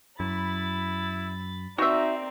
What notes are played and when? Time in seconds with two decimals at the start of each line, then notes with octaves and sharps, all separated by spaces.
0.20 F#2 E4 B5 A6
1.78 C4 D#4 F#4 A#4 D5 E5